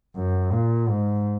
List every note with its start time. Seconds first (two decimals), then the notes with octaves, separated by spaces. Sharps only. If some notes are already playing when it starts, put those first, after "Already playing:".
0.16 F#2
0.51 A#2
0.88 G#2